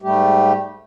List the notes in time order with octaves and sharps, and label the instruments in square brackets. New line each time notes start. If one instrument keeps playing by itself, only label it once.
[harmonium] G#2 G3 A3 G4